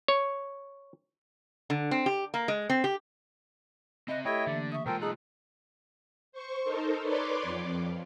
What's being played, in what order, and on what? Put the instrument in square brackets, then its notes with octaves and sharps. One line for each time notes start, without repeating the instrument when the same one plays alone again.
[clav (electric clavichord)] C#5
[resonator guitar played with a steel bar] D3
C4
G4
A#3
G#3
C4
G4
[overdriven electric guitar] C4 E5 [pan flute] D#5 [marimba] B5 F#6
[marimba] A3 G4 A4 [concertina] E4 C#5 D#5 [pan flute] E5 [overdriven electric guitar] G5
[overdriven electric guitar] D3 [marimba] E3 A#3 [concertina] D5
[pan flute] E5 [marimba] C#6 D#6
[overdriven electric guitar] B1 F4 [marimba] G#3 [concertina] A4 A#4 C5 [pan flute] G5
[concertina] D#4 A4 F#6 [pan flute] G#4
[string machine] C5 C#6
D#4 A4 A#4 C5
B4 C#5 D5 C6 D6
F2